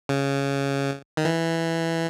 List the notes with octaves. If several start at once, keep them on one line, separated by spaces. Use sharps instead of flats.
C#3
D#3
E3